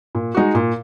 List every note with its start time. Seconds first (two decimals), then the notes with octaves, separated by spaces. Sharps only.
0.15 A#2
0.35 G#3 D#4 F#4
0.55 A#2